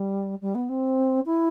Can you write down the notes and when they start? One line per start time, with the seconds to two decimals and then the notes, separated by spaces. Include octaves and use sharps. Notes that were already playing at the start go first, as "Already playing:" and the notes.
Already playing: G3
0.41 G3
0.55 B3
0.69 C4
1.25 E4